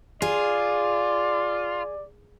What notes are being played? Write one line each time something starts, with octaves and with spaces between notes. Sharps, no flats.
F4 G#4 D5